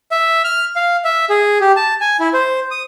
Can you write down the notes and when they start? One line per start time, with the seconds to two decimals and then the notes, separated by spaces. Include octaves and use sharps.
0.12 E5
0.44 F6
0.76 F5
1.05 E5
1.30 G#4
1.61 G4
1.76 A5
2.01 G#5
2.20 E4
2.33 C5
2.71 D#6